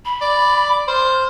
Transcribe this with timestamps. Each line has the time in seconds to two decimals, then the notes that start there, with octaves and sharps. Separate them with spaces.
0.05 B5
0.21 D5
0.88 C5 F6